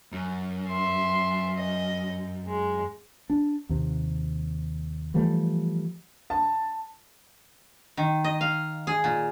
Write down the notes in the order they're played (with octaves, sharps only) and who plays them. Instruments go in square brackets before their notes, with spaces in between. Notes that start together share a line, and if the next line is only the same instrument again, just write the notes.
[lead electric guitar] F#2
[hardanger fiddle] E5 C6
D#5
G#3
[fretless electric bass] D4
D#2 C3
E3 F3 G3 A3
[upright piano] A5
[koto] D#3
D#5
F5
G#4
A#2